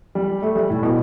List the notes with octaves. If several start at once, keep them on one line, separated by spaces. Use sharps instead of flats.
G3
A3
G3
A2
B2